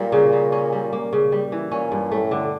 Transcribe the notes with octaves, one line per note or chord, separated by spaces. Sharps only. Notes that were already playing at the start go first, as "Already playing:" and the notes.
Already playing: A#2 G3 A#3
C#3
C#3
C#4
G3
A#3
C#3
G3
E3
A#2 C#4
G2
A2 A3
D3